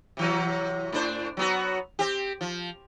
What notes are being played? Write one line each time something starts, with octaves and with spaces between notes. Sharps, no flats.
C3 E3 F#3
A2 D4 C5
F#3 B3 F#4
C4 G4
F3